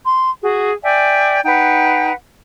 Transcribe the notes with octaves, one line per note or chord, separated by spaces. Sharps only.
C6
F#4 G#4
D5 E5 G5 G#5
D#4 B4 F#5 G5